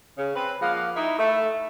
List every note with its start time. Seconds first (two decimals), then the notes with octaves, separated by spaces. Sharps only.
0.18 C#3
0.36 C4 B4
0.62 F3 G#3 A#3 F5 F#5
0.96 D#4 E4
1.19 A3